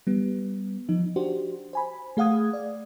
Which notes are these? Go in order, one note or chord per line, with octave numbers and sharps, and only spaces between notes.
G3 B3
F3 D#4
D4 F#4 G4 C5
C5 G#5 B5
A3 G#4 F5 F#5 D#6 G#6
D5